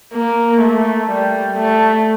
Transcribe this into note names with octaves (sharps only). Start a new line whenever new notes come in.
A#3
A3
G3
A3